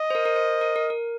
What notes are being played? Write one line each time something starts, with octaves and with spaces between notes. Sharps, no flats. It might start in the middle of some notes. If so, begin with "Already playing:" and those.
Already playing: D#5
C5
A#4
A#4
C5
A#4
A#4
A#4